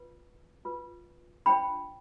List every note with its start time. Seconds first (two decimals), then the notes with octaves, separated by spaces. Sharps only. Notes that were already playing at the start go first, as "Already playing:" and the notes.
Already playing: F4 B4
0.65 F4 B4
1.46 D4 F4 C5 G5 B5